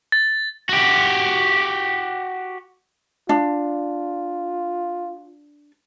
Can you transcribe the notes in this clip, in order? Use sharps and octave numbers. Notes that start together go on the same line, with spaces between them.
A6
F#4 G4
D4 F4